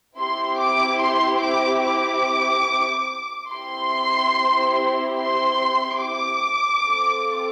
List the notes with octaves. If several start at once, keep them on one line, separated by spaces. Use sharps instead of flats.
C4 E4 G4 C6
D6
C6
D6
D6
C4 E4 G4 C6
C6
D6
C4 F4 A4